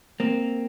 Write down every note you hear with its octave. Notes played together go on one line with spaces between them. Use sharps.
A#3 C4